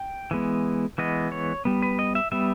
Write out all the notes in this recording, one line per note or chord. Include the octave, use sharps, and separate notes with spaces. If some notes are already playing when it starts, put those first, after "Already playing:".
Already playing: G5
E3 G#3 B3
E3 G#3 B3 D#5
C#5
G3 B3
B4
D#5
E5
G3 B3 E5